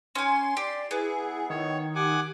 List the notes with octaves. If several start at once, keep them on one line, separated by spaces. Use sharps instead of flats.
C#4 G#5 C6
G4 D5
B3 E4 G#4
D#3 C#5
G4 F#5 G#5 D6